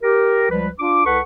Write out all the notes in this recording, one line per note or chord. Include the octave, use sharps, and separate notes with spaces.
G4 A#4
C#2 F3 G3 B4
D4 F4 D6
C2 A4 B4 F#5 C#6